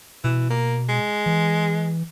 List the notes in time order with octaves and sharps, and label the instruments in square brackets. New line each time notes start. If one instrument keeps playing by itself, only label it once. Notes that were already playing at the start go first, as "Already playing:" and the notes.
[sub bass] B2 [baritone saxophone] E3
[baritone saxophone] A#3
G#3
[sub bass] E3